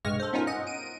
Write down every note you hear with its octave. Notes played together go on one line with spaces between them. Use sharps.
B1 G2 G#3 C#6 F6 A#6
A4 C5
B3 C#4 D#4 F4 A#4
D#5 F#5
D7 D#7